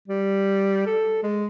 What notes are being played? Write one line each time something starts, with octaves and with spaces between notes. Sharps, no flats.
G3
A4
G#3